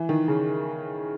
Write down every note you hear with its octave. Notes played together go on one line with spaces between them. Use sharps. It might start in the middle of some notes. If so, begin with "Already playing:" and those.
Already playing: E3
D#3
C#3